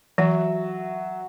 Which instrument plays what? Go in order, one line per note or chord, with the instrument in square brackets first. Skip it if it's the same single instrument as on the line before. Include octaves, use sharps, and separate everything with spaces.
[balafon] E3 [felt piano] F#3 [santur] F#4 E5